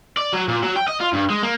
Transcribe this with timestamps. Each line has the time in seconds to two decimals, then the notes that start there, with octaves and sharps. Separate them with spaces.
0.17 D5
0.33 F#3
0.48 A#2
0.63 F#3
0.76 G5
0.88 D#5
1.00 F4
1.13 G2
1.30 G#3
1.43 A#3